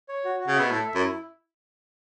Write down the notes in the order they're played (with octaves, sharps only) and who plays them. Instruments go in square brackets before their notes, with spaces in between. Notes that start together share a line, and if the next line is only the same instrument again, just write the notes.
[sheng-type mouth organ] C#5
F#4
F#4
[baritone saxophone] C#3
[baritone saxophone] B2 [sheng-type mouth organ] E5
[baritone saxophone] A2 [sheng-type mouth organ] A4
[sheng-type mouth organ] E5
[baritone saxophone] F#2
[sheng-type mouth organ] E4